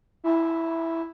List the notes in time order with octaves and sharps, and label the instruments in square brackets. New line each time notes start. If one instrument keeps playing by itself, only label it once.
[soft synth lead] E4